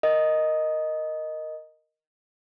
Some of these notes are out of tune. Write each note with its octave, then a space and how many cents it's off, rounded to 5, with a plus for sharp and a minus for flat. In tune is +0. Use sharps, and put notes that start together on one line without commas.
A#4 +0 D#5 +0